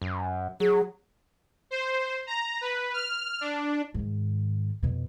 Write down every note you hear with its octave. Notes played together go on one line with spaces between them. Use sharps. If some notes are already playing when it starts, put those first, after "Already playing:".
F#2
F#3 G#4
C5
A#5
B4
F6
D4
G#2 D#3
F2 B2